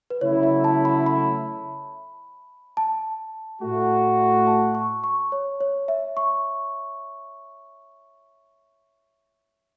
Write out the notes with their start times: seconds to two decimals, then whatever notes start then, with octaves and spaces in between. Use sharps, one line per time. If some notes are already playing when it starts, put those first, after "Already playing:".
0.10 B4
0.21 C#3 F#3 A3 E4 C#5
0.43 E5
0.64 A5
0.85 B5
1.06 B5
2.77 A5
3.61 A2 A3 F#4
4.47 A5
4.75 C#6
5.04 C#6
5.32 C#5
5.61 C#5
5.88 E5
6.17 C#6